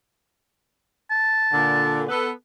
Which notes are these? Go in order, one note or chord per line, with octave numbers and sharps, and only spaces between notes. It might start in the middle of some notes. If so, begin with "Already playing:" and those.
A5
A#2 D3
B3 A4